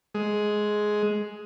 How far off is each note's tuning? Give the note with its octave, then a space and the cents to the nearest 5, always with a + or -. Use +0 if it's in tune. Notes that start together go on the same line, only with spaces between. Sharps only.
G#3 +10